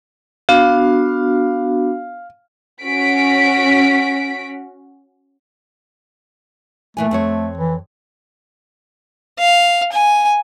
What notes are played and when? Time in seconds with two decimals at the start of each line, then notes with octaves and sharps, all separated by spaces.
0.49 B3 D4 F#4 F5
2.85 C#4 F#4 B6 D7
6.97 A#2 E3 A3 G#5
7.11 F2 C4 C#5
7.58 E3
9.39 F5
9.92 G#5